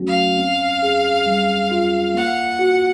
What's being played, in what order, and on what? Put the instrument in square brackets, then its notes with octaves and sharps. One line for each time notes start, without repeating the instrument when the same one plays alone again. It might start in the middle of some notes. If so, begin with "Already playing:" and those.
Already playing: [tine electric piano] F#3 A3 C#4 F#4
[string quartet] F5
[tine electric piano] C4
G#4
G3
F4
[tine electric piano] A#3 [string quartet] F#5
[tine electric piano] F#4